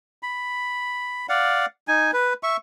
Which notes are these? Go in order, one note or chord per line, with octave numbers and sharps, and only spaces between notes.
B5
D5 F5 F#5
D#4 G#5
B4
E5 C#6